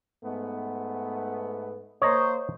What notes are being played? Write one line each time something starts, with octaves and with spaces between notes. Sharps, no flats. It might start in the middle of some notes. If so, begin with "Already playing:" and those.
G#2 A3 B3
A#3 C5 C#5 D#5 A#5